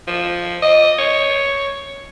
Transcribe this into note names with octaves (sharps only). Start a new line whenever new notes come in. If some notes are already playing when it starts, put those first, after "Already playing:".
F3
D#5
C#5